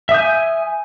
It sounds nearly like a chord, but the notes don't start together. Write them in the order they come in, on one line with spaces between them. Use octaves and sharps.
E5 D#6 G6 G#5